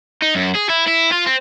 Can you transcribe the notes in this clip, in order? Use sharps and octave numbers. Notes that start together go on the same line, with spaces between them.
D#4
F#2
G#4
E4
E4
F4
C4